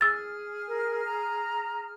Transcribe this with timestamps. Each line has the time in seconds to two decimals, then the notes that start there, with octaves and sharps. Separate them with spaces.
0.01 G#4 E6 F6 A6
0.68 A#4
1.06 A#5